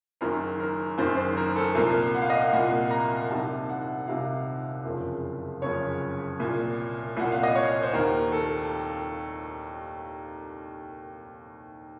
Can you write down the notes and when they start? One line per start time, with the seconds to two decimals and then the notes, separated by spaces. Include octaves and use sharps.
0.21 F#1 F#2 D#3 A#4
0.60 A#4
0.98 F#1 F#2 D#3 C5
1.17 C5
1.37 A#4
1.56 A4
1.75 C2 A#2 A#4
2.14 F#5
2.22 F5
2.30 D#5
2.38 F5
2.52 C2 A#2 F#5
2.91 A#5
3.30 C2 C3 D#3 A5
3.69 F#5
4.08 C2 C3 D#3 F5
4.85 F#1 F2 C#3
5.62 F#1 F2 C#3 C#5
6.40 C2 A#2
7.17 C2 A#2 F#5
7.32 F5
7.43 D#5
7.55 C#5
7.83 C5
7.93 D#2 D#3 A#4
8.32 A4